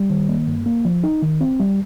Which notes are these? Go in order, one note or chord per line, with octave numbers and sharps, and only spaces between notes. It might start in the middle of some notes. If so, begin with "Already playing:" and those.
Already playing: G3
D#3
A#3
G2
A#3
F3
D#4
D#3
C4
G3